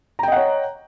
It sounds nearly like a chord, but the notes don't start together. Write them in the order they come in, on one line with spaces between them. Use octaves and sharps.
A#5 G5 D#5 F#5 C#5